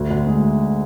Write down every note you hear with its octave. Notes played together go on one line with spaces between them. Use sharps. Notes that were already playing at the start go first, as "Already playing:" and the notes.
Already playing: D2
D2
G#3